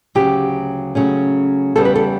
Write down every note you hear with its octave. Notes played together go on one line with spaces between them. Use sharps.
D2 C#3 F#3 G4
C#3 F#3 A3 C#4
E2 C#3 G3 B3 A4
B4
A4